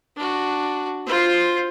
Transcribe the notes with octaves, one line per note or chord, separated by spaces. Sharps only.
D4 F#4
F4 C5